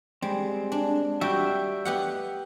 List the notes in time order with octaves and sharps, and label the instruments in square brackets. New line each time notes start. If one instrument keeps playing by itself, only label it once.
[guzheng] G3 [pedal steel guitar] G#3 C4
[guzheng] D4
[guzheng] G3 F#4 [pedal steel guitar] E5 G5
[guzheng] B3 G4 F#5